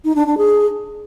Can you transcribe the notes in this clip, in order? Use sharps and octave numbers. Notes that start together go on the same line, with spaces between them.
D#4
D4
D4
G#4